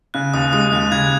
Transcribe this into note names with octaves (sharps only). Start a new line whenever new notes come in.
C#3 F#6
D#2 D#6
G#3 D#6
D#2 F#6
C#3 G#6